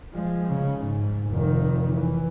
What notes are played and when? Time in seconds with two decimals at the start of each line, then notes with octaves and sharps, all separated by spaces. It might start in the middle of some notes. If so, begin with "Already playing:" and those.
0.13 F3 G#3
0.48 C#3
0.81 G#2
1.31 F1 D#3
1.92 E3